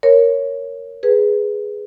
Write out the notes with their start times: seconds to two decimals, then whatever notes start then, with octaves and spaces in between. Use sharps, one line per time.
0.03 A#4 C#5
1.03 G#4 B4